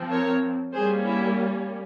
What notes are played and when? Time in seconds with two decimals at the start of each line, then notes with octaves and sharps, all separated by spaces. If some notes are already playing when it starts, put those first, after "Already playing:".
Already playing: F3 C4
0.09 A#4 C#5
0.73 G3 A#3 C#4 G#4 C5
1.05 E4